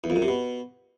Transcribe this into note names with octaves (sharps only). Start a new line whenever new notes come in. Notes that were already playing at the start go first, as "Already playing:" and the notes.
E2
F2
F#2
C3
B2